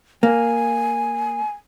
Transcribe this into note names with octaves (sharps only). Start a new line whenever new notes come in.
A#3 G#5